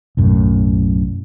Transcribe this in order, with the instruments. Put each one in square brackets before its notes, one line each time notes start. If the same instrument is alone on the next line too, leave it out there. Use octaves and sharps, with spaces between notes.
[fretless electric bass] B1 F#2 A2